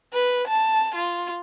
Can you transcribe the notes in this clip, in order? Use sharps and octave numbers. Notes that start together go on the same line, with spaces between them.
B4
A5
F4